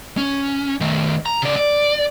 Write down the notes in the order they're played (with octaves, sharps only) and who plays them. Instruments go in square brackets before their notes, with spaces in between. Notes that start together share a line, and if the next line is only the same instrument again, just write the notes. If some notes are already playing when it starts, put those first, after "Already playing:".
[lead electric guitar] C#4
D#3 A3
A#5
C#3 D5
D5